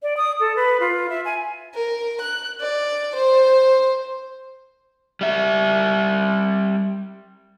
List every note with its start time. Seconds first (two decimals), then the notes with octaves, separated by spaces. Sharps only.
0.03 D5
0.17 D#6
0.40 A4
0.56 B4
0.80 F4
1.09 E5
1.25 G#5
1.74 A#4
2.20 F#6
2.61 D5
3.15 C5
5.21 G3 E5